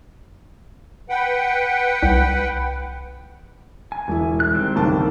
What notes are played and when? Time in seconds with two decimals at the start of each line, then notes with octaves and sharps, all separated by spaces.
1.09 B4 F#5 G5
2.03 C2
3.92 G#5
4.08 E1 E4
4.40 F#6
4.54 D#3 G3 C4
4.75 F#1 B1 A5